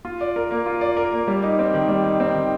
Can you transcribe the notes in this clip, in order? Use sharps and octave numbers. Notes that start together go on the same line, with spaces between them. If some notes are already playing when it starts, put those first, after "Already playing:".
F4
D5
A#4
A#3
F4
D5
A#4
A#3
G3
D#4
C4
D#3
G3
D#4
C4
D#3